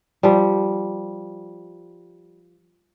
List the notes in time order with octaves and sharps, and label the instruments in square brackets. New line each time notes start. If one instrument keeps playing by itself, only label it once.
[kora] F3 G3